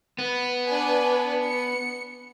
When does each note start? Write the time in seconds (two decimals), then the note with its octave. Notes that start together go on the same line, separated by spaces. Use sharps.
0.18 B3
0.66 D4 B4 G#5
1.45 C#7